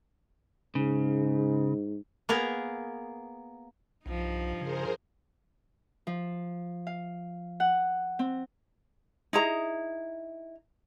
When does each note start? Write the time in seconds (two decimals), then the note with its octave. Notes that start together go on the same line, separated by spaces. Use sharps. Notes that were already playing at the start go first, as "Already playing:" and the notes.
0.75 G#2 C#3
2.29 A#3 B3 G#4 A#4
4.06 B1 G2 F3 D#4
4.61 C#3 G#4 A#4 C5
6.07 F3
6.87 F5
7.60 F#5
8.19 C4
9.33 D#4 E4 G#4 A#5